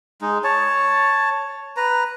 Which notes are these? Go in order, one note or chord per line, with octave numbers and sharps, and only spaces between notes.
G#3 D#4
C#5 A5
B4 A#5